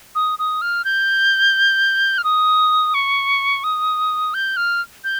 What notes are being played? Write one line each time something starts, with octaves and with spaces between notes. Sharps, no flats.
D#6
D#6
F6
G6
F6
D#6
C#6
D#6
G6
F6
G6